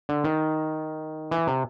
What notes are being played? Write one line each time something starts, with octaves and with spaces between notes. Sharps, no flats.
D3
D#3
E3
C3